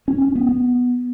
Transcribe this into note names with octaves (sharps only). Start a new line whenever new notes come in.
C#4
C#4
B3
B3